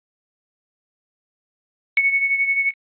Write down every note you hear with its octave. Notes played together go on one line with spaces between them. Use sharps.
C#7